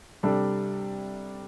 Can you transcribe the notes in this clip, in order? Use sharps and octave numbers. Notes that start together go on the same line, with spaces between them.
C3 G3 D4 A4